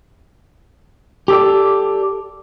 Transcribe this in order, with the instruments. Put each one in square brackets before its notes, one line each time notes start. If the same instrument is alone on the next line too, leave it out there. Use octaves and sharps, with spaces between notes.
[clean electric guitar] G4 A4 D5